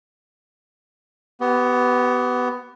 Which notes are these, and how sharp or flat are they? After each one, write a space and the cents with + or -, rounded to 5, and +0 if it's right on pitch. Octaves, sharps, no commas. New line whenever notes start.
B3 +10 G4 -30